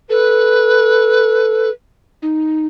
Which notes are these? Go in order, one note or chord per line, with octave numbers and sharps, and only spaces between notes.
A4 B4
D#4